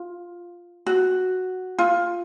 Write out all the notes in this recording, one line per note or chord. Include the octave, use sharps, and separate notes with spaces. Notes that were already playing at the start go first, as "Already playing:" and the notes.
Already playing: F4
F#4
F4